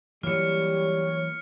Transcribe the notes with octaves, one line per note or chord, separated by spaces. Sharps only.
E3 F#3 G3 A#3 C#5 F6 C#7